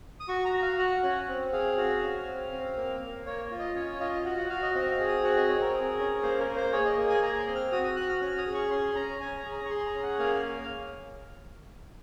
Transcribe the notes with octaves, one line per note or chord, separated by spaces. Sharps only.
D#6
F#4 C#6
A#5
F#4
F5
F#4 F#5
C#4
C4
G#4 F5
F#4 F5
C#4
C4
C4
A#3
A#3
A#3 C#5
F4
D#5
C#4 C#5
F4 D#5
F#4 F#5
F#5
F#4 F5
D#5
C4 D#5
F5
G#4
D#6
F#4 F#5
D#5
C4 C#5
A#4
G#4
C#4
A#3 C5
A#4
A#3
C5
G#4 C#5
D#5
A#3
G#5
G#4 A#5
C6
C4
F6
F#4 D#6
D#6
F#4 F#6
F6
C#4 F6
D#6
G#4
C#6
C#4 C6
C#4 A#5
C#4 G#5
A#5
G#4
A#5
C#6
G#4 C6
A#5
C#4
F#5
A#3 F5